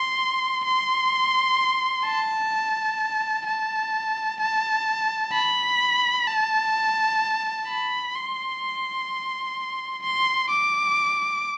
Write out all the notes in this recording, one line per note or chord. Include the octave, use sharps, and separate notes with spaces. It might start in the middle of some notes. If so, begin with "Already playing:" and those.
Already playing: C6
C6
A5
A5
A5
B5
A5
B5
C6
C6
D6